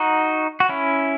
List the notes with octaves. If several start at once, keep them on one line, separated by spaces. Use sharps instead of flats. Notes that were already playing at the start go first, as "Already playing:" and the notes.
Already playing: D#4 F#4
F#4
C#4 E4